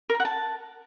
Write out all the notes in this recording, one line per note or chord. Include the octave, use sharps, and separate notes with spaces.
A#4
A#5
F#5
A5